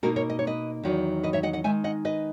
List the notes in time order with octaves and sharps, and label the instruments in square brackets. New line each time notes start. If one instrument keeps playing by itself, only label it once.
[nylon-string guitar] B2 A#3 D#4 F#4 A#4
A#4 C#5
D#5
C#5
B4 D#5
E2 D#3 F#3
B4 D#5
C#5 E5
D#5 F#5
D#5 F#5
D#3 G#3 D#4 E5 G#5
D#5 F#5
B4 D#5